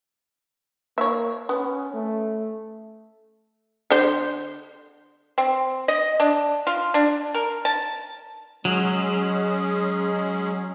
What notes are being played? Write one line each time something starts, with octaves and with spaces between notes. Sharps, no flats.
A#3 C#5 E5
B3 C#4
A3
D3 C5
C4
D#5
D4
F4
D4
A#4
A5
F#3 G#3 C#4 G#4